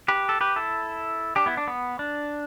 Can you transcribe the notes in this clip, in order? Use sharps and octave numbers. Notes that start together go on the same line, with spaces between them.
G4 B4
A4
G4 B4
E4 A4
D4 G4
B3 E4
D4
B3
D4